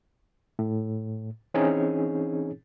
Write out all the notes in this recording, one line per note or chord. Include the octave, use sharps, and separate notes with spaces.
A2
E3 C4 C#4 D#4 G#4 C#5